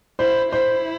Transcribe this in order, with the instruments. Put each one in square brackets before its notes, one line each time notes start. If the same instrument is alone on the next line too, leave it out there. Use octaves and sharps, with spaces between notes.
[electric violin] E4 [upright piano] C5
[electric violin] E4 [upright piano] C5